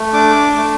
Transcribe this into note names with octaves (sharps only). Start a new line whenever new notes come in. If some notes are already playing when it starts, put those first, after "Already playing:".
Already playing: A3
D4 D6
A3